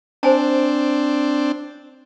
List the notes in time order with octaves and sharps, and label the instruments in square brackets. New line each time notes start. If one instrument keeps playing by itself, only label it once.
[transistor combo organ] C4 D4 [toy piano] C5 G#5 A5